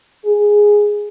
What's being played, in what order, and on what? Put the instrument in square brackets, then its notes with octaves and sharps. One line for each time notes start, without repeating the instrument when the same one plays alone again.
[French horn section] G#4